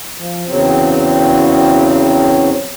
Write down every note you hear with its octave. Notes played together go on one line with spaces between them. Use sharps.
F3
E2 C#3 F#3 C4